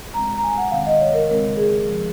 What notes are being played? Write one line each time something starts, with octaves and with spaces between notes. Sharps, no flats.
A#2 G#3 C4 A#5
A#5
G#5
F#5
C3 D#3 G#3 C4 F5
D#5
C#5
A#4
C#3 G#3 C4 A#4
G#4
C#3 F3 G#3